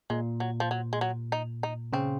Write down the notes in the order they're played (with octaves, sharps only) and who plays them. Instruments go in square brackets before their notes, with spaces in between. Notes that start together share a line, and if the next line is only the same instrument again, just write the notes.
[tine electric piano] A#2 [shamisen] G#3
[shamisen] F#3
F3
F#3
G#3
F#3
D#4
D#4
[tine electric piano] C#3 [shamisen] C4